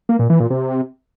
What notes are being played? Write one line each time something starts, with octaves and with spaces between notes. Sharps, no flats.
A#3
A#2
E3
A#2
C3